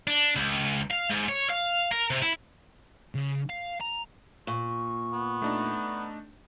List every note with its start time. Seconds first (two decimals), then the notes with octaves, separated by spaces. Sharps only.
0.07 D4
0.36 C#2
0.91 F5
1.10 G#2
1.29 C#5
1.49 F5
1.91 A#4
2.11 C3
2.22 E4
3.15 C#3
3.50 F5
3.81 A#5
4.47 A#2 C#6
5.13 B3
5.42 A3 D4 D#4